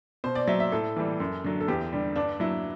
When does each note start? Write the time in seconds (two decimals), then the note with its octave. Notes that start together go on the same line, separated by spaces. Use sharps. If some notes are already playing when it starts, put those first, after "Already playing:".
0.24 B2 C5
0.35 D5
0.47 F#3 E5
0.60 E5
0.72 A2 A4
0.96 E3 G3
1.20 F#2
1.44 D3 F#3
1.60 A4
1.68 E2 G4
1.93 D3 G3
2.16 G2 D4
2.40 F#3 E4